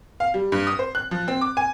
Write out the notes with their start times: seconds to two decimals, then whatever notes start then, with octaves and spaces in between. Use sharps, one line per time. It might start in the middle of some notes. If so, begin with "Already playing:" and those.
0.20 F5
0.34 G3
0.52 G2
0.67 D#6
0.79 C5
0.95 F#6
1.11 F3
1.28 C4
1.41 D6
1.57 G#5